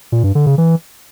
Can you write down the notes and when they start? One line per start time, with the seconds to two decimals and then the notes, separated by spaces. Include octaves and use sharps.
0.12 A#2
0.24 G2
0.35 D3
0.46 C#3
0.58 E3